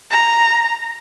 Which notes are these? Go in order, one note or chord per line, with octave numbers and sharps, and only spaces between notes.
A#5